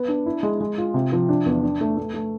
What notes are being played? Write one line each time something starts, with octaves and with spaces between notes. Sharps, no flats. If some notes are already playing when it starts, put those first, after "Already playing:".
Already playing: B3
D4
E4
G#3
G#3
F4
C3
F3
D4
E2
D4
A3
A3
A3